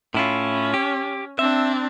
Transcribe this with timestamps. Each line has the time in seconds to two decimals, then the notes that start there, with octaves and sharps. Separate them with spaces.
0.14 A2 C#4 E4 F4
0.74 G4
1.39 C4 D4 E5